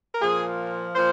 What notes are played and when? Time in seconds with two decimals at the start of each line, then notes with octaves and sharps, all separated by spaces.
0.13 A#4
0.21 A#2 F3 A#3 G#4
0.95 A#2 F3 C5